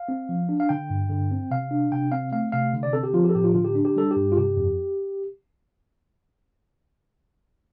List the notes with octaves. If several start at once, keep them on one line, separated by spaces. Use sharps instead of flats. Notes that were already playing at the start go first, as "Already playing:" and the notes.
Already playing: F5
C4
F3
D4
F5
D3 G5
G2
D3
C4
C3 F5
D4
C3 G5
C4 F5
A3 F5
C3 F5
D3
D5
C4 A4
G4
F3 F4
G4
A4
A2 G4
F4
D3 F4
G4
D4
G4
G3 A4
G4
G2
F4
C3 G4
F2